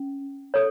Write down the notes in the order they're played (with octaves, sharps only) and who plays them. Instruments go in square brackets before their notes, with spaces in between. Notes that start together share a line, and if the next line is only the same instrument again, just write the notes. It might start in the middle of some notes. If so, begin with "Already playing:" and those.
Already playing: [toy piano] C#4
A4 C#5